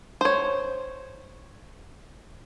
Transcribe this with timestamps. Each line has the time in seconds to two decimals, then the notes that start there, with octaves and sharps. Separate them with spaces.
0.21 C5 C#5